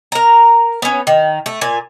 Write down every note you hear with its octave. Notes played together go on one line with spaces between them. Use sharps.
A#4 A#5
B3 C#4
D#3
A3
A#2 G#5